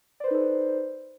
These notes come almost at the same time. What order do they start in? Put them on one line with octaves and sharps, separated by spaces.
D5 C5 B4 D#4 A4